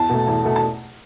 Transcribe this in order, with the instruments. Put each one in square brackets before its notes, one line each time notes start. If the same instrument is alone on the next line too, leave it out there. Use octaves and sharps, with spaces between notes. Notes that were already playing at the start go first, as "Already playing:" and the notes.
Already playing: [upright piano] E2 A5
B2 A3
E2
B2 A3
A5